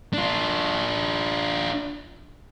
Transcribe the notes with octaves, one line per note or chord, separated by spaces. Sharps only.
D4 F4